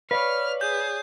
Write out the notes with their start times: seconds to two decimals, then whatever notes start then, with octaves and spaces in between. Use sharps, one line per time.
0.11 B4 C#5 D5 F5 F6
0.61 G#4 G6